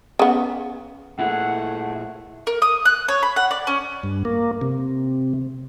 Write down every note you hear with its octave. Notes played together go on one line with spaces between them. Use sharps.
C#3 B3
A#2 A3 E4 G#4 F#5
A#4
D#6
F#6
C#5
B5
F#5
D5
C#4
G2
A#3
C3